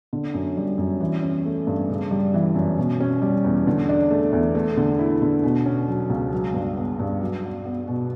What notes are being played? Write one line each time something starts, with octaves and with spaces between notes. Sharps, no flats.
D3
F#2
G3
F#2
E3
C#4
A3
G2
C#3
G3
E3
F#2
B2
C#4
G3
E2
D3
D4
A3
E2
A3
D3
E4
D3
B2
C#4
F#3
C#2
F#3
G2
B3
G2
F#3
F#4
B3
B2